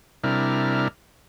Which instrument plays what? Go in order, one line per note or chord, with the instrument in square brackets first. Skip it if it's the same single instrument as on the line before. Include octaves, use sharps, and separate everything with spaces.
[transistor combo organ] C3 G3 D4 E4 A#4 F6